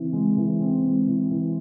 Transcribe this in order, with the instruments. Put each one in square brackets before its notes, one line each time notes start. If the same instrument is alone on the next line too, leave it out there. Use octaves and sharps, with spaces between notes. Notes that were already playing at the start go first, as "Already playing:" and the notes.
Already playing: [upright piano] C#3 E3 C4
G#3
E3
C4
G#3
E3
E3